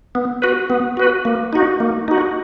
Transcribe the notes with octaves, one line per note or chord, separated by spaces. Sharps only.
B3
F#4 B4
B3
F#4 B4
A#3
D#4 F#4
A#3
D#4 F#4